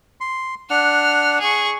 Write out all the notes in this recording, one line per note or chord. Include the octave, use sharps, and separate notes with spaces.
C6
D4 F#5 F6
G#4 C#6